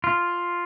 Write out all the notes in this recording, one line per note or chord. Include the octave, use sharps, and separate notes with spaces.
F4